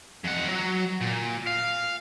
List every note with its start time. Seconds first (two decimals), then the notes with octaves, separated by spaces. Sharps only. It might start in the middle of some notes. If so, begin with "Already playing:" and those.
0.24 F2 F#5
0.49 F#3
1.01 A#2
1.47 F5